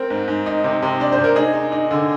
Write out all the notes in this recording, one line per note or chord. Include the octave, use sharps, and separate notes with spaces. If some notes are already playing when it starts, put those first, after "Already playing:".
Already playing: C4 A#4
G#2
G#2
D#4
C3
C3
D4 D5
C5
C3
A#4
D#4 G#4
D#4
D#4
D3